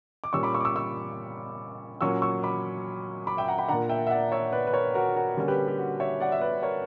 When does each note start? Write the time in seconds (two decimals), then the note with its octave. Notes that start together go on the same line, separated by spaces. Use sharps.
0.24 D6
0.33 A#2 G3 C#4 C#6 E6
0.43 B5 D6
0.54 C#6 E6
0.61 D6
0.65 C#6 E6
0.76 C#6 E6
2.01 A#2 F#3 A#3 C#4 C#6 E6
2.22 C#6 E6
2.43 B5 D6
3.27 B5 D6
3.37 E5 G5
3.48 F#5 A#5
3.58 G5 B5
3.68 A#2 A#3 D4 F#5 A#5
3.89 E5 G5
4.07 E5
4.10 D5 F#5
4.32 C#5 E5
4.53 B4 D5
4.67 B4
4.73 A#4 C#5
4.94 F#4 A#4
5.15 F#4 A#4
5.37 D3 G3 A#3 C#4
5.48 G4 B4
5.68 G4
5.79 F#4
6.00 C#5 E5
6.20 D5 F#5
6.32 E5
6.41 B4 D5
6.63 A#4 C#5